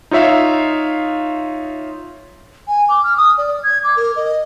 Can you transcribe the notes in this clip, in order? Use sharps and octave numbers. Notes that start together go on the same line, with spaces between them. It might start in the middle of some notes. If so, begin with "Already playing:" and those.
D#4 F4 C#5 E5 F5
G#5
D6
F6
D#6
D5
G#6
D6
A#4
D#5